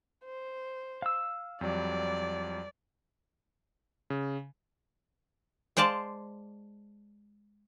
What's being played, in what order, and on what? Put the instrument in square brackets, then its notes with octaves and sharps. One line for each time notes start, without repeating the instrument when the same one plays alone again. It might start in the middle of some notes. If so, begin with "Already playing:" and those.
[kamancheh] C5
[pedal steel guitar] F5 E6
[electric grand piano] F2 F#3 G3 [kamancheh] D5
[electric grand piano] C#3
[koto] G#3 C5 D5 F5 A5